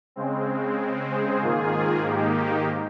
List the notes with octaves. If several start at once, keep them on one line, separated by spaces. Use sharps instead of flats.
C#3 G#3 C4
G#4 C5
G#2 D#3 A#3 F4 G#4
D#4 G4